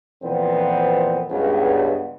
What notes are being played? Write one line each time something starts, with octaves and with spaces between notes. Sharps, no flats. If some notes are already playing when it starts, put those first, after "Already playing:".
F2 A#2 E3 B3 C4 C5
C#2 G2 B3